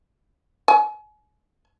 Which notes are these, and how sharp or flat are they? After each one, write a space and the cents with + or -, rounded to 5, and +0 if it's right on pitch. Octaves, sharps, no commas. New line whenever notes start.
G#5 +35